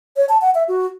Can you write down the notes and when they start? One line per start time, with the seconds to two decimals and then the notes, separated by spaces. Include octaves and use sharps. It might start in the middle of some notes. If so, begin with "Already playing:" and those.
0.16 C#5
0.29 A5
0.41 F#5
0.55 E5
0.68 F#4